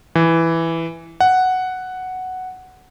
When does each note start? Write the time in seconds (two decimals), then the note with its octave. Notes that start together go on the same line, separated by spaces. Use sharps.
0.15 E3
1.20 F#5